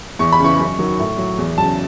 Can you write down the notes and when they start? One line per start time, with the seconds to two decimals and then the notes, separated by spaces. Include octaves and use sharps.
0.19 E2 C#6
0.33 B5
0.40 C#3 E3 C#6
0.60 F#2
0.79 D#3 F#3
0.99 A2
1.18 F#3
1.38 E2
1.58 C#3 F#3 A5